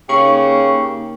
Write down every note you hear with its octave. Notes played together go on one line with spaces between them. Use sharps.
C#3 A#3 D#4 G4 A#4 C#6